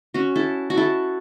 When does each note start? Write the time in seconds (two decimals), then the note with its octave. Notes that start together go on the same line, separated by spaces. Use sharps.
0.14 C#4 F#4
0.36 E4 A4
0.70 F#4
0.77 E4 A4